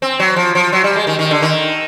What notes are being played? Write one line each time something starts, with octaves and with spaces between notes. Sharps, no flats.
C4
F#3
F3
F3
F#3
G3
G#3
D#3
D#3
D3
D#3